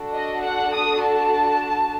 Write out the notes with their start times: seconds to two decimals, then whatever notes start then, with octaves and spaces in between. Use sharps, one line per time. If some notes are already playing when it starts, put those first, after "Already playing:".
Already playing: D4 F#4 A4
0.15 D#5
0.44 F#5
0.74 D#6
1.03 A5